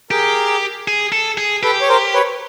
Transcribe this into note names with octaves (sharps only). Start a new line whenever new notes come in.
G4 G#4 A#4
G#4
A4
G#4
G4 A4 B4
C#5
A#4 C5
B4 C#5